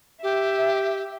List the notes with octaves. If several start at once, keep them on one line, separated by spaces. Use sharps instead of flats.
G4 E5